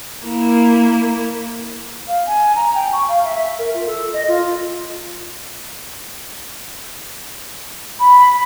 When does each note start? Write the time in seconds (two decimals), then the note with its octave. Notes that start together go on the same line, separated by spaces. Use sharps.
0.24 A#3 E4
2.08 F5
2.26 G#5
2.56 A#5
2.75 G5
2.93 C#6
3.08 F5
3.24 E5
3.59 A#4
3.74 F4
3.87 A4
4.13 D#5
4.28 F4
8.00 B5